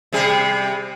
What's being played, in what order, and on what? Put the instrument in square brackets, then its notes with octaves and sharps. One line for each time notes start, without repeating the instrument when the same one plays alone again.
[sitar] C3 G3 G#4